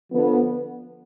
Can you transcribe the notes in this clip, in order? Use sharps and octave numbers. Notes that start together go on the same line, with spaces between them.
D3 F3 B3